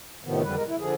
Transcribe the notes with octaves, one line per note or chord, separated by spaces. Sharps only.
A2 C3 D#3 F3 B3
F2 D3 G3 B4
G#3 A#4
E4
D3 F3 G#4